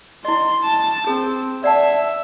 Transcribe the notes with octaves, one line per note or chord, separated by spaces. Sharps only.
E4 D#5 C6
A5
C4 G#4
D5 E5 F#5 A5